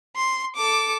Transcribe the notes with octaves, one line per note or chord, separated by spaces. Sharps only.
C6
A4 D6